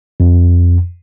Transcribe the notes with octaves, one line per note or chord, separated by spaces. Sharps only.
F2